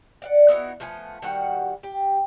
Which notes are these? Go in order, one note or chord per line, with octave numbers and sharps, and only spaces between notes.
D5 F5 F#5
B3 D#4 E4 F#4
F3 A3 B3 G#5
D#3 G3 F#4 F#5
G4